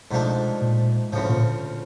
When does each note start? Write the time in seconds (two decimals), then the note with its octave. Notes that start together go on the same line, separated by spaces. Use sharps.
0.11 G#2 B2 F3 A3 D4
0.62 A#2
1.13 D2 A2 C#3 F3
1.30 A#2